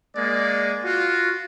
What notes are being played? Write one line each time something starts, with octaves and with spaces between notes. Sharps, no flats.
G#3 A#3 D5
F4 F#4